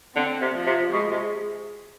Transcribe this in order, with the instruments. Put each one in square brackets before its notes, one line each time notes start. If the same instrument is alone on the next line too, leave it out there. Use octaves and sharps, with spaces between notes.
[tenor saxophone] D3 [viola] C4
[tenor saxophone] C3
[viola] F3
[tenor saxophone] C3
[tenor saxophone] B2 [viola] G#3
[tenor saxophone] C3